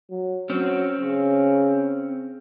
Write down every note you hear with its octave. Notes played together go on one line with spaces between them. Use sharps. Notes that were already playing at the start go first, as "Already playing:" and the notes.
F#3
F#3 C4 C#4
C#3